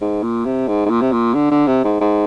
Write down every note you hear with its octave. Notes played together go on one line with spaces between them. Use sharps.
G#2
A#2
C3
G#2
G#2
A#2
C3
A#2
D3
D3
C3
G#2
G#2